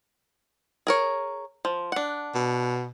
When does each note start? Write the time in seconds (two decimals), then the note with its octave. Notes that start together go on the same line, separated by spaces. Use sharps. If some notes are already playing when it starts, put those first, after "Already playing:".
0.87 G#4 A#4 C#5
1.65 F3
1.92 D4 F#5
2.35 B2